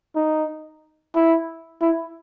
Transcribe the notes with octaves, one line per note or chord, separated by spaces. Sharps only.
D#4
E4
E4